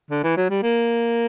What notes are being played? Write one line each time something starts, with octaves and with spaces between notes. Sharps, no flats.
D3
E3
F#3
G3
A#3